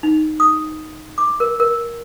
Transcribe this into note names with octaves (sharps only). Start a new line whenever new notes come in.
D#4
D#6
D6
A#4
A#4